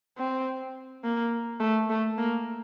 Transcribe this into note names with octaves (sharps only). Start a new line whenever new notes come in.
C4
A#3
A3
A3
A#3